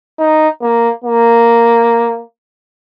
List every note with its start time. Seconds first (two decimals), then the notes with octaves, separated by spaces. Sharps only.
0.19 D#4
0.62 A#3
1.04 A#3